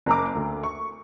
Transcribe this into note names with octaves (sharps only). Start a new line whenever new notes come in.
F#1 A#5 D6
D2
C#6